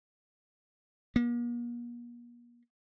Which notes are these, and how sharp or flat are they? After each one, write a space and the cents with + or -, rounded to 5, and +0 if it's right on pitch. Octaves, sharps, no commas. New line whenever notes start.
A#3 +45